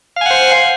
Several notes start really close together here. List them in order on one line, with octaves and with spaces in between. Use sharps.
F5 G#5 F#5 C5